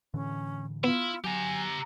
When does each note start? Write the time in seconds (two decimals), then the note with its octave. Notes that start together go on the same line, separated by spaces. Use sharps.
0.14 A2 D3 E3 C#4
0.84 B3 E4 F4
1.24 F#3 G4 G#5 A#5